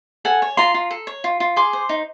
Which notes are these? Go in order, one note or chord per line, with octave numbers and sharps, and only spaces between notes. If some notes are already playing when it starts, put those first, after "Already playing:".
A4 F#5 G#5
C#5
F4 A#5 C6
F4
A4
C#5
F4
F4
G#4 C6 D6
C5
D#4